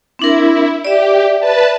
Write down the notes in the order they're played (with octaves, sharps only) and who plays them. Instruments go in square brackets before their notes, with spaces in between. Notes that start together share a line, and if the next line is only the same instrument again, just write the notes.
[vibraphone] C4 D4 A#4 [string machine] E4
[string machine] G4 [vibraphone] D5 E5
[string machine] B4 A5